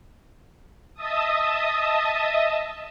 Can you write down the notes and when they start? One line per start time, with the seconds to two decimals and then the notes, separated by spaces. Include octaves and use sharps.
0.94 D#5 E5 A5 D#6